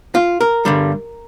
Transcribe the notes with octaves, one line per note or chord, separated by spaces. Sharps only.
F4
A#4
G2 D3 G3